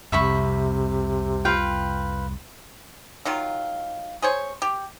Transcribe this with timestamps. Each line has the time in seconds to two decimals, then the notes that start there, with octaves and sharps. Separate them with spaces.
0.12 C2 F2 C3 E5 B5 C#6
1.45 F4 B4 G5
3.25 D#3 F#3 F4
4.22 G#4 C5 C#5
4.62 G4